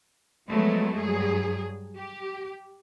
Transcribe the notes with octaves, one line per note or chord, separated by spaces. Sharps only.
F3 F#3 G#3 A3 B3
G2 F#3 G#4
G4